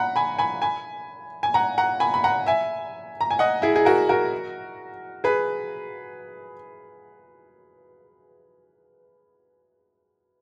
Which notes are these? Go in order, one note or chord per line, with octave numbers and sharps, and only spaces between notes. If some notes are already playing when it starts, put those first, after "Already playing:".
Already playing: F#5 A#5 B5
G#5 B5
G#5 B5
G#5 B5
G#5
F#5 A#5
F#5 A#5
G#5 B5
B5
F#5 A#5
E5 G#5
A#5
G#5
D#5 F#5
E4 G#4
G#4
F#4 A#4
F#4 A#4
G#4 B4